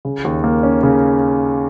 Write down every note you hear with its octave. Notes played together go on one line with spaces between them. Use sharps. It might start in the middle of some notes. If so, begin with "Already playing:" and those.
C#3
D#2
A#3
C#4
C#3